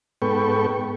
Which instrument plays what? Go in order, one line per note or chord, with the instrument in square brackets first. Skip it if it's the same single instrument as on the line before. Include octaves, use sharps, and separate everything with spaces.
[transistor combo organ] G#2 B3 A4 B4 G5 C#6